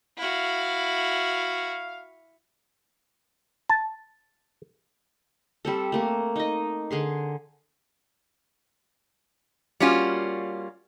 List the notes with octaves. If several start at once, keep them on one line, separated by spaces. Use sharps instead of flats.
E4 F#4 F5
A5
G3 C4 A4
A3 A#3 A4
D#4 D#5
D3 G#4 C6
G3 A#3 C#4 F4 F#4